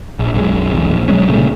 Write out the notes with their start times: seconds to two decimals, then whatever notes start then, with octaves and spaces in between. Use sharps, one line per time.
0.19 A#1
0.34 B1 F#2 G#3
0.73 B1 E2
0.91 A#1
1.08 B1 F#3 G#3 C#4
1.28 C2 A#2 C#3 A3